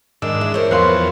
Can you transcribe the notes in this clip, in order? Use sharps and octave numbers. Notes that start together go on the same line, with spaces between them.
G#2 D#3 D4 E6
E3
A#4 C5 C#5
E2 F3 F#3 B4 F5 C6